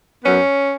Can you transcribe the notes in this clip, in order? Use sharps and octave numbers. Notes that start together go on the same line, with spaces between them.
F#2 F#3 B3 C#4